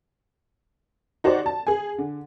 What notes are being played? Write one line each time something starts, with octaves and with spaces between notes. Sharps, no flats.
D#4 F#4 G4 C5 D5
A5
G#4 G#5
D3